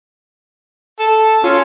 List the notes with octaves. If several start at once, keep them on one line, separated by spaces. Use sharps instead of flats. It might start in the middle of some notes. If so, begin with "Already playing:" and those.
A4
C#4 F4